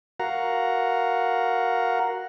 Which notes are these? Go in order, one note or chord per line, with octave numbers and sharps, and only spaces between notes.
F#4 A#4 F5 F#5 A#5